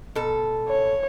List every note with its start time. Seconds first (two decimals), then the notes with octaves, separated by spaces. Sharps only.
0.15 B2 A4
0.69 C#5